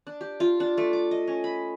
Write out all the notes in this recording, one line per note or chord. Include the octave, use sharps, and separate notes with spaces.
D4
G4
F4
D4
A3
D6
D#5
C#4
B5